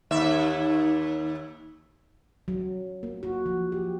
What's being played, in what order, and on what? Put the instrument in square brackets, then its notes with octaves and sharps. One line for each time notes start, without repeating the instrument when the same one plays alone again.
[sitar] D#2 E5
[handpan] F#3
A#3
F#4
F3
G4